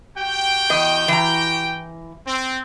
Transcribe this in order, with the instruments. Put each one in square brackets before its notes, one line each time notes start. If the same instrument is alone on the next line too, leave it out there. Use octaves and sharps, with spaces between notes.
[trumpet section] F#4 G4 G5
[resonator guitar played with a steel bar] E2 D#5
E3 A#5
[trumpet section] C4